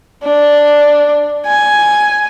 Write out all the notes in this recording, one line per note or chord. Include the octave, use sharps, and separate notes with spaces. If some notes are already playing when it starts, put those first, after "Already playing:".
D4
G#5